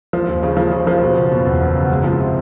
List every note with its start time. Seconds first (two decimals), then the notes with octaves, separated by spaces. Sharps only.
0.13 F3
0.28 D#2
0.43 C#3
0.57 F3
0.71 C#3
0.87 F3
1.02 B2
1.16 F#1
1.32 B2
1.45 E2
1.61 F#1
1.75 F#1
1.90 G#3
2.04 F3
2.20 C3